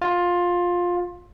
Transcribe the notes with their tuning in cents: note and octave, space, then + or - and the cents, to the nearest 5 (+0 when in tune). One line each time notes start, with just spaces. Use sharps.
F4 +15